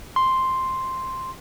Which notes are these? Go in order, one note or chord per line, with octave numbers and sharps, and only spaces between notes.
C6